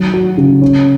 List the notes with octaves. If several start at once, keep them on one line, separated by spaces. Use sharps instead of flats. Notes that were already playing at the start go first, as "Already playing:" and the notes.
Already playing: D#3 F#3
F#4
C#3
C#4